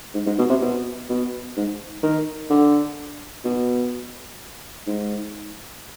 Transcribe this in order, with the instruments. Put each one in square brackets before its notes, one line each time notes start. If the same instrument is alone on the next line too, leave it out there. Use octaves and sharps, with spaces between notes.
[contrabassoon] G#2
G#2
B2
C3
B2
B2
G#2
D#3
D3
B2
G#2